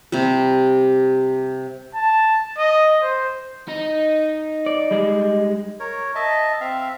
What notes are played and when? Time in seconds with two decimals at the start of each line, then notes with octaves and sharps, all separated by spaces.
0.12 C3 G3
1.94 A5
2.58 D#5
3.02 C5
3.69 D#4
4.66 D5
4.91 G3 G#3
5.80 A#4 C#5
6.15 D#5 E5 A5
6.61 C4 E5 F5